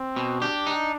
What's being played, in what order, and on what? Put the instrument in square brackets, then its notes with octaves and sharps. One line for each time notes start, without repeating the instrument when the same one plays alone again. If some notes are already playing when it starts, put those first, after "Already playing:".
Already playing: [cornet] C4
[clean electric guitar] B2
[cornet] D4 [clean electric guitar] G4
[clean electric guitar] D#4